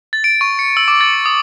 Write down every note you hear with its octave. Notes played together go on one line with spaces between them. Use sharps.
A6
D7
C#6
C#7
E6
D6
A6
C#7
D#6